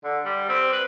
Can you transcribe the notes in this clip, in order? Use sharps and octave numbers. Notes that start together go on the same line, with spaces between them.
D3
G3
C4
B4